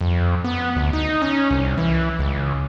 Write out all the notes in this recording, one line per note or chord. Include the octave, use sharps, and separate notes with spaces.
F2
B3
D2
D#4
C#4
C2
E3
C#2